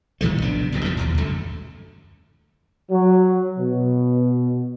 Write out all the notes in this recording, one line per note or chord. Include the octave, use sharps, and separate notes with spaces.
A2 D#3 G3 A3
A#1 C3 B3 D4
C#2 F#2 B2 C4
G2 B2 D3 F3
D1 D#2
B1 F#2 D3 A3
F#3
B2